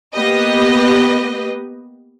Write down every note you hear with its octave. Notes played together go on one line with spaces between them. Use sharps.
A#3 B3 G4 B4 D#5